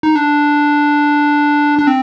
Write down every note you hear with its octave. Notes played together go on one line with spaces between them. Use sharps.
D#4
D4
D4
C4